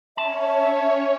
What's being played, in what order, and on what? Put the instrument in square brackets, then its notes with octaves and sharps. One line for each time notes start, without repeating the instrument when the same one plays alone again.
[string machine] C#4 C#5 [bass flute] E5 [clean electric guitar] A5